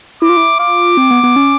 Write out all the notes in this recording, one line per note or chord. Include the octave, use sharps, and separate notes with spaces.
E4 D6
F4
E4
F4 D6
C4
B3
B3
C#4